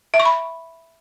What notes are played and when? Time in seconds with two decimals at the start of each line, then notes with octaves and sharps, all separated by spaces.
0.14 E5
0.20 C#6
0.25 B5